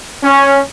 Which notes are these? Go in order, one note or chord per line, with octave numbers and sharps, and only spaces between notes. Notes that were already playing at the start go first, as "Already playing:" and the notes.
C#4